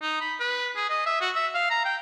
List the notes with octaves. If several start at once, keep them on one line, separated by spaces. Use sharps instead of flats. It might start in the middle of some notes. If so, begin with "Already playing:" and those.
D#4
B5
B4
G#4
D#5
E5
F#4
E5
F5
A#5
G5